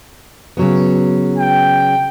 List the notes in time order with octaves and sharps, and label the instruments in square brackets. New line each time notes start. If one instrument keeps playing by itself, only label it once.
[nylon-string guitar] C#3 F#3 B3
[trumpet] G5